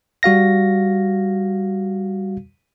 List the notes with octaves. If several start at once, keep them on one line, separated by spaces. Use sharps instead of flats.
G3 F#4 F5 A#6